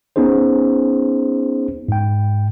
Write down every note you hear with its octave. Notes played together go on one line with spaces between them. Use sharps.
B3 C#4 D#4 G#4 C5
G#2 G5